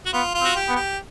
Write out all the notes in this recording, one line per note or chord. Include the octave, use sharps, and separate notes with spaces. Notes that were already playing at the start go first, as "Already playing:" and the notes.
F#4
B3 F4
F4
C4
F#4
G4
B3
G4